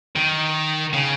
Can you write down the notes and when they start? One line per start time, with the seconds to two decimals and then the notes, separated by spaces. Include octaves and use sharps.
0.16 D#3
0.93 C#3